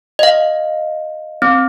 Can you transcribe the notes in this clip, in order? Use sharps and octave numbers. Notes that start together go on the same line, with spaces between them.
D#5 F5
C4